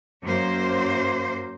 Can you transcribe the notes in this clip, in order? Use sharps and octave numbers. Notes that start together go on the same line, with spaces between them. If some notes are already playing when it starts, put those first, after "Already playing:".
F#2 A#3 C5